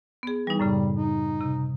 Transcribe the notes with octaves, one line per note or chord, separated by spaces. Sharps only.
B3 G#4
E3 G3 D#4
F#2 A2 C#3 G3
D#4
C3